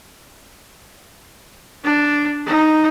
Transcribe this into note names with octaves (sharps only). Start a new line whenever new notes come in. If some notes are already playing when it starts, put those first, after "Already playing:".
D4
D#4